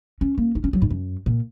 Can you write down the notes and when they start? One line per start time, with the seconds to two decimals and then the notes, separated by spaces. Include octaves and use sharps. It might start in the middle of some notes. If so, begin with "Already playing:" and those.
0.21 C#4
0.38 A#3
0.55 D#4
0.64 C#4
0.73 F#3
0.82 G#2
0.91 F#2
1.26 A#2